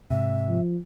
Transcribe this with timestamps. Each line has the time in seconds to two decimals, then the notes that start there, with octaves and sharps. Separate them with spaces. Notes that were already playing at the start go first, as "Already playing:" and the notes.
0.10 G#2 C3 E5
0.49 F3